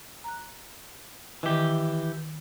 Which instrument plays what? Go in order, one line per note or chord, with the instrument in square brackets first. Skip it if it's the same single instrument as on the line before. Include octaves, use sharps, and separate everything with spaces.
[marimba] A#5 F#6
[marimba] D#3 [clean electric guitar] E3 G4